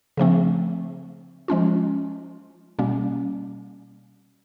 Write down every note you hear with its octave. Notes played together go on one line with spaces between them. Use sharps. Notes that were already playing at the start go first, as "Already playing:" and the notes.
C#3 F3 A3 C4
F3 G#3 C#4 F4
B2 G3 A#3 C#4